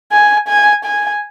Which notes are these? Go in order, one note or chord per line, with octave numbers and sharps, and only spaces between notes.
G#5
G#5
G#5